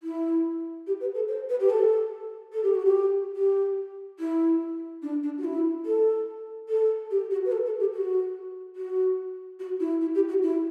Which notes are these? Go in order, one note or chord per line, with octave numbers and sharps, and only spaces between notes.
E4
G4
B4
A4
C5
B4
G4
A4
A4
G4
F#4
G4
G4
E4
D4
D4
F#4
E4
A4
A4
G4
F#4
B4
A4
A4
G4
F#4
F#4
F#4
E4
E4
G4
F#4
E4